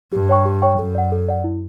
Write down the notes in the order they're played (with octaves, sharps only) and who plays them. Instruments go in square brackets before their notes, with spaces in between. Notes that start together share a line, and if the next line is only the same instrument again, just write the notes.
[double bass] G2 [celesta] G4
[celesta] C#5 G5 C#6
G4
C#5 G5 C#6
[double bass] F#2 [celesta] A4
[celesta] D5 F#5
A4
D5 F#5
E4